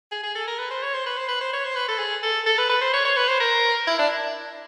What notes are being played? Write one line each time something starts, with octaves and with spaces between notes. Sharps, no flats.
G#4
G#4
A4
A#4
B4
C5
C#5
C5
B4
C5
B4
C5
C#5
C5
B4
A4
G#4
A4
A4
B4
B4
C5
C#5
C#5
B4
C5
A#4
E4
D4